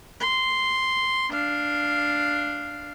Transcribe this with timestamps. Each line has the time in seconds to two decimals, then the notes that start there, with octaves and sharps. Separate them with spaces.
0.20 C6
1.31 D4 F5